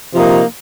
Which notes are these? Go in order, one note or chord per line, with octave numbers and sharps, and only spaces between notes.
C3 F3 A#3 D#4